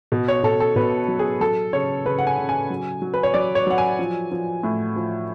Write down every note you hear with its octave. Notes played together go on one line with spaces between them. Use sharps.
B2
C#5
B2 A4
A4
B2 B4
F#3
G#4
F#3 A4
C#3 C#5
C#3 B4
F#5
G#5
C#3
G#5
F#3
F#3
B4
C#5
F#3 D5
C#5
F#3 F#5
G#5
F3
F3
A2
F3